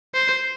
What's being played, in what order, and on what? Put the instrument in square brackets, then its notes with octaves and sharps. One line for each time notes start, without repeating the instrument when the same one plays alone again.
[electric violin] C5